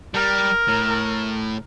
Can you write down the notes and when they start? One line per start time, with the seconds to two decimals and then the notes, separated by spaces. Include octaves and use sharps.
0.14 G3 A#4
0.68 A2